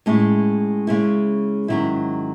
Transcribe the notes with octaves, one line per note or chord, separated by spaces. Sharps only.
A2 G#3 C#4 E4
C#3 G#3 C#4 E4
G#2 D#3 F#3 C#4 E4